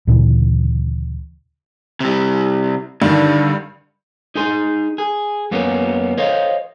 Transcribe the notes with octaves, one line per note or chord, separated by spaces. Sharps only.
D2 A#2 C#3 E3
C3 G3
G2 D3 D#3
D#4 G#4 G#5 C6
G#4
F#2 A#3 B3 C#4
C5 C#5 D#5 F5